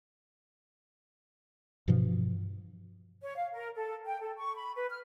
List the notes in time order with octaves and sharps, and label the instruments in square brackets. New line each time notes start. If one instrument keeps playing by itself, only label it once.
[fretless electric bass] G2 B2 E3 F3
[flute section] C#5
F5
A#4
A4
G5
A4
C#6
B5
B4
F6